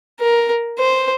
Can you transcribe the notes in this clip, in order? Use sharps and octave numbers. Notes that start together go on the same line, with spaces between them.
A#4
C5